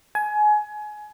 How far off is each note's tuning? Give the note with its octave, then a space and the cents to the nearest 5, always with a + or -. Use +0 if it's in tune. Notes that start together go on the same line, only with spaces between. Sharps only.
G#5 +25